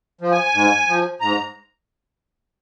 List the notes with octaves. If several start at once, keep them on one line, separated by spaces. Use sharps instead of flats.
F3
G#5
G#2
F3
G#2 A#5